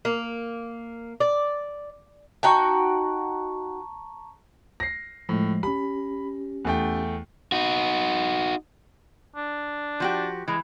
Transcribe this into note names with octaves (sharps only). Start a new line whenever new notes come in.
A#3
D5
D#4 F#4 G5 A5 A#5 C#6
A#6 C7
A2 F3 G#3
C#4 G4 B5
E2 A3 G5
D#4 F#4
D4
F3 F#4 G4
E3 G#3